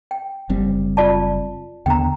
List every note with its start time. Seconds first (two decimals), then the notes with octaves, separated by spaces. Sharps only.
0.11 G5
0.50 F#1 G3 C4
0.97 F4 D5 A5
1.86 D#2 D3 B3 G5 A#5